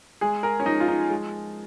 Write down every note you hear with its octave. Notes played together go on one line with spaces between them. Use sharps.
G#3 G#4
A#4
C#4
F3 D#4
F4
D#4
G#3